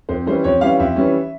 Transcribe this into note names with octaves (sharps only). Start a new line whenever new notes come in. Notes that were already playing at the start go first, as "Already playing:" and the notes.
F2 C5
E3 G3 C#4 C5
F2 C#5
E3 G3 C#4 F5
F2 E5
E3 G3 C#4